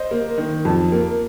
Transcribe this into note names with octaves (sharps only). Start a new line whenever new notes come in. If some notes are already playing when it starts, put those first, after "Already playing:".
Already playing: C5 D#5
A#3
D#3
F2
A#3